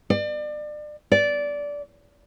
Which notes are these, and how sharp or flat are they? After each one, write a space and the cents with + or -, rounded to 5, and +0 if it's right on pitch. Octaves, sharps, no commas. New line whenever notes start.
D5 +35
D5 -15